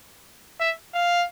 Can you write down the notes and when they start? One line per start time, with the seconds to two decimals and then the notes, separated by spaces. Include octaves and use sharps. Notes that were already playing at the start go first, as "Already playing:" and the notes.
0.60 E5
0.94 F5